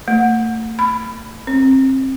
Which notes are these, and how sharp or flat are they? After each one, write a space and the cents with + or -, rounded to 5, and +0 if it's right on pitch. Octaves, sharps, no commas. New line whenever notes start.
A3 +35
B5 +15
C4 +25